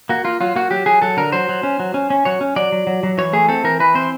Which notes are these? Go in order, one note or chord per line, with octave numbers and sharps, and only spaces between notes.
A#3 F#4
A#3 F4
F#3 F4
A#3 F#4
F#3 G4
F#3 G#4
F#3 A4
D3 A#4
F#3 C5
F#3
C#4
F#3
C#4
C#4
F#3 C#5
C#4
F#3 D5
F#3
F#3
F#3
E3 C#5
A3 G#4
C4 A4
E3 A#4
E3 B4
C4 C5